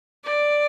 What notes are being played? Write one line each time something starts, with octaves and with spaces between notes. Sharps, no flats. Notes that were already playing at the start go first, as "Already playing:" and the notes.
D5